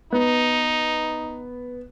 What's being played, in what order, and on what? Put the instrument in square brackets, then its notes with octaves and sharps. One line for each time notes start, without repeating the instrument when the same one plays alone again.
[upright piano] B3 [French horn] D#4